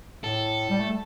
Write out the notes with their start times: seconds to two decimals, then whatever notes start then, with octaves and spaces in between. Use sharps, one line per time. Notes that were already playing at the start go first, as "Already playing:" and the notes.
0.24 A2 A4
0.70 G3
0.80 A3